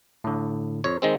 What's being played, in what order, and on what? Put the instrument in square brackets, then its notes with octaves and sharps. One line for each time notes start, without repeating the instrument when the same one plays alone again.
[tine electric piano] A2 D3
[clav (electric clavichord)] F2 C#5
D#3 G#3 C4